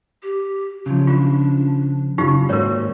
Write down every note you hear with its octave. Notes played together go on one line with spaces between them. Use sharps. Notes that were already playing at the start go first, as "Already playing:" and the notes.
G4
C#3 F3 F#3
D4 F4
F#2 C#3 D#4 F4 G4
D#2 G#2 A#3 F#4 A#4 C#5